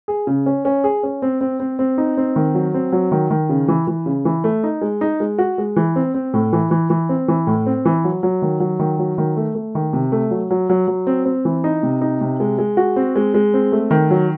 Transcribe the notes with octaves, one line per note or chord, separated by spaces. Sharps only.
G#4
C#3
C#4
C#4
G#4
C#4
C4
C4
C4
C4
D#4
C4
D#3
F#3
C4
F#3
D#3
D#3
C#3
E3
E3
C#3
E3
A3
D#4
G#3
D#4
G#3
F#4
G#3
E3
C4
C4
A2
E3
E3
E3
C4
E3
A2
C4
E3
F#3
F#3
D#3
F#3
D#3
F#3
D#3
A3
A3
D#3
C3
A3
F#3
F#3
F#3
F#3
C4
C4
E3
D#4
C3
D#4
C3
G#3
G#3
F#4
C4
G#3
G#3
C4
A3
D#3
F#3